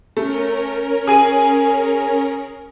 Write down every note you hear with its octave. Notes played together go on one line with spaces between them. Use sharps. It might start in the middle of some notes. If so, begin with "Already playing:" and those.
A3 C#4 A#4
G#4 G#5 D#7